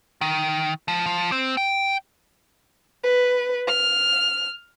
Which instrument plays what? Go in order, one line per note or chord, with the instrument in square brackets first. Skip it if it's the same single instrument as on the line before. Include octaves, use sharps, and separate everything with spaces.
[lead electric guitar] D#3
F3
F3
C4
G5
[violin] B4
F6